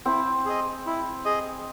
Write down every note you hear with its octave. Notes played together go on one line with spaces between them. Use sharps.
C4 E4
G#4 D#5
E4
G#4 D#5